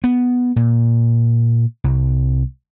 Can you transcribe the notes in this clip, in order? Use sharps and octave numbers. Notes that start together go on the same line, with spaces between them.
B3
A#2
C2